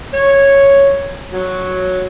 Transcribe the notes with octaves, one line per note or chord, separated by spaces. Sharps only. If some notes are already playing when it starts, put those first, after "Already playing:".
C#5
F#3